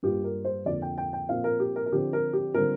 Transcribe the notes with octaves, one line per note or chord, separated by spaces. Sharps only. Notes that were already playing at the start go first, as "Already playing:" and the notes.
G2 G3 A#3 F4 G4
A#4
C5
F2 D3 A#3 F4 D5
G5
G5
G5
A#2 F3 C4 F4 F5
A#4
G4
A#4
A#4
D3 F3 C4 G4
A#4
G4
D3 G3 C4 F4 A#4